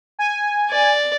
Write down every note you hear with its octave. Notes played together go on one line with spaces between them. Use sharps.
G#5
D5